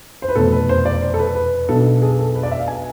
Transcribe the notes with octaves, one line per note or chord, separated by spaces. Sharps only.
C5
B4
F1 E2 B2 A4
B4
C5
D5
C5
A4
B4
B4
B1 B2 B3 D4 A4
G#4
A4
B4
D5
E5
F5
G#5